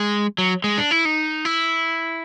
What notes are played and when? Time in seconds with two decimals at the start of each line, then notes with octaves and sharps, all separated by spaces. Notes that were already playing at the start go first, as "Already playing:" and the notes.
Already playing: G#3
0.38 F#3
0.64 G#3
0.78 D4
0.91 E4
1.05 D#4
1.45 E4